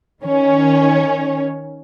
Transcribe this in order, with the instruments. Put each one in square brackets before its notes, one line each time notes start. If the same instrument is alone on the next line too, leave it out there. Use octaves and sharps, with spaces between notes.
[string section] D#3 C#4 C#5